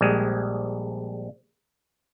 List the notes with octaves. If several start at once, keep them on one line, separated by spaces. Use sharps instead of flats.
A#1 G3 G#3